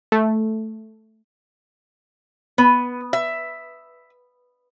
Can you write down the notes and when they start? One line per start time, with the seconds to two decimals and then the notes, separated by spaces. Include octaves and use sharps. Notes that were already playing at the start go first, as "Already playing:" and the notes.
0.12 A3
2.58 B3
3.13 E5